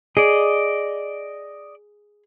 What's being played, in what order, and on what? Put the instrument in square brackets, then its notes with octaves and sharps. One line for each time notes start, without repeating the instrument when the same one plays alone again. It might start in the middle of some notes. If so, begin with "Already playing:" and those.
[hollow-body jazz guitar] G#4 [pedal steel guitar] D5 D#5